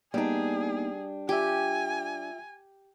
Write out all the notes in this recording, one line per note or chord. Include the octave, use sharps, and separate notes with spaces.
G3 A#3 B3 D4 D#4 G#4
F4 G4 E5 G#5